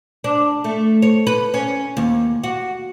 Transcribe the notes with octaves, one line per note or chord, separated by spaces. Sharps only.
D4
A3
C#5
B4
C#4
D#2
F#4